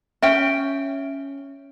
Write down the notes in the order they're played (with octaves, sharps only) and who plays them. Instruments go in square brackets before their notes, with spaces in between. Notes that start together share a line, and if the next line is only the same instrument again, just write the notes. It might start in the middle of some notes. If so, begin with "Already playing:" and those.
[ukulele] C#4 G5 [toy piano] E5